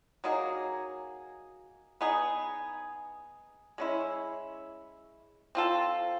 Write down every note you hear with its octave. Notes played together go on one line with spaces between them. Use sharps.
F#3 A#3 D#4 G#4
B3 D#4 G#4
G#3 C#4 E4
C4 F4 A4